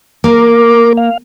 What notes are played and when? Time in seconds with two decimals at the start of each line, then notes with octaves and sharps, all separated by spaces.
0.24 A#3 A#4 D6
0.97 F5